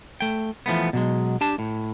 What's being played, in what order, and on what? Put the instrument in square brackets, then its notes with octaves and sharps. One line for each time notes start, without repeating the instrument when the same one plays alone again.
[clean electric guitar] A3 G5
E3 F3 A3 B3
B2 F#3 G#3
D4 G4 A5
A2